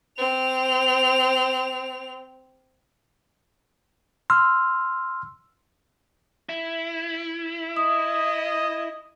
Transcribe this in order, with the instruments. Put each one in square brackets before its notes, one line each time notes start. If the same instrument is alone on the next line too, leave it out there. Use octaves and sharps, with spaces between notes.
[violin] C4 F7
[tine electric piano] C6 E6 F6
[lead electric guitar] E4
[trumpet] D#5 [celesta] D#6